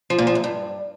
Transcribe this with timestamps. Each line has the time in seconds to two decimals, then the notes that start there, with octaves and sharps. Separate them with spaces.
0.10 F3
0.18 A#2
0.27 F3
0.35 F#2
0.44 G2